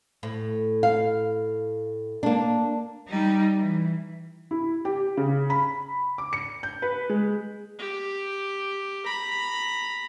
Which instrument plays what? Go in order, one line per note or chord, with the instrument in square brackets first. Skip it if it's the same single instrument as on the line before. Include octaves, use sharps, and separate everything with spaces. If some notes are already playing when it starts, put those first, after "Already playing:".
[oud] A2
[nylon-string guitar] F5
A#3 D4
[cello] G3 D#4
E3
[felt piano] E4
G4
C#3
B5
D6
C#7
G6
B4
G#3
[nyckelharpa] G4
A#5 B5